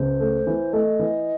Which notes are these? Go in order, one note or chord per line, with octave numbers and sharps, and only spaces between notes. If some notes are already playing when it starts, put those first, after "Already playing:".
Already playing: C#2 C5
A3
E3
A3 D#5
E3